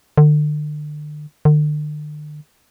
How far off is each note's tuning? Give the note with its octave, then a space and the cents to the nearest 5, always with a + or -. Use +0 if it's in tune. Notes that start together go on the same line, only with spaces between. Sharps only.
D3 +35
D3 +40